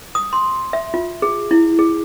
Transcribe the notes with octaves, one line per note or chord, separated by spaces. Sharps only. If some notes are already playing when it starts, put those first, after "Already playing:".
D#6
C6
E5
F4
G#4
E4
G#4